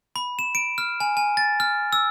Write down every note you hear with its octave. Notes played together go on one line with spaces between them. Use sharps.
B5
E7
D7
F6
G#5
G#5
A6
F6
E6